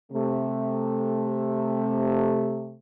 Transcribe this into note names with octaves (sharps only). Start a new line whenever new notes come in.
C3 A3